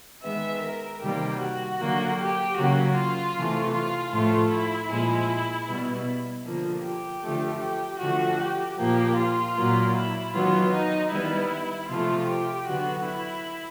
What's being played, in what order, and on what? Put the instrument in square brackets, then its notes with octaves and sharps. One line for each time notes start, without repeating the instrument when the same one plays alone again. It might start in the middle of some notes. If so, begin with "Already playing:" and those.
[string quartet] D#3 G#3 B3 E5
A#4
C3 D#3 G3 A#3 G4
F#4
D3 F#3 A#3
G4
C#3 F#3 A#3 F#4
F4
C3 E3 A3
F4
A2 F3 A3 F4
E4
A#2 F3 G#3 E4
B2 G3 B3
D3 F3 A#3
G4
D3 F3 A3
G4
D3 F3 A3 F#4
G4
A#2 F3 A#3 G4
F4
A#2 F#3 A#3
E4
D#3 F#3 B3 F4
D#4
D#3 G3 B3 E4
C3 F3 A3 F4
G4
D3 F#3 B3 F#4
E4